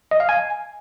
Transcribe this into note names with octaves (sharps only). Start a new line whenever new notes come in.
D#5
F5
G#5